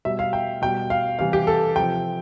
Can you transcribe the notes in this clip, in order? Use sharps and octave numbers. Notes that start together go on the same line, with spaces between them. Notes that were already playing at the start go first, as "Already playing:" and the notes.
B2 G3 E5
F5
G5
B2 G3 G5
F5
C3 E3 G3 F5
G4
A4
C3 F3 G5